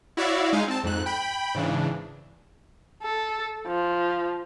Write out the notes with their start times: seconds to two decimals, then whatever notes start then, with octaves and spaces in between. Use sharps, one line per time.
0.17 E4 F#4 C#5 D5 E5 F5
0.53 G#3 D#4 G#4 F5 G#5
0.68 C4 A5
0.83 F2 G#2 F#6
1.06 G5 B5
1.55 G#2 C#3 E3 D4
3.03 A4
3.67 F3